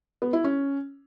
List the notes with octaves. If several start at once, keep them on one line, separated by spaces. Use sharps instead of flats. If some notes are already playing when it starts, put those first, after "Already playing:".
B3
E4
C#4